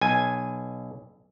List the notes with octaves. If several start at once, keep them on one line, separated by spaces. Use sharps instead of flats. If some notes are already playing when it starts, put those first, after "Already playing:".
B1 G#5